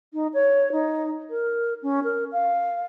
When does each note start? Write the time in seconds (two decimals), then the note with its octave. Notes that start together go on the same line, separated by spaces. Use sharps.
0.14 D#4
0.34 C#5
0.72 D#4
1.30 A#4
1.83 C#4
2.04 A#4
2.32 F5